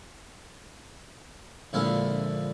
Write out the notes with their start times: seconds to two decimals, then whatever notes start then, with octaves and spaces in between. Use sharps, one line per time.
1.73 A#1 D3 G#3 E4 F5